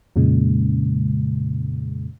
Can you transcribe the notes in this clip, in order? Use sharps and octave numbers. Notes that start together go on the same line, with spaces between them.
F2 A#2 C#3 G#3